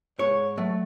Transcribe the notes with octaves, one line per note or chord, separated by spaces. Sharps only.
G#2 C#5
F#3 A3